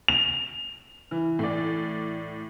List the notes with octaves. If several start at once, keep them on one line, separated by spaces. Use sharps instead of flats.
F7
E3
A2 D5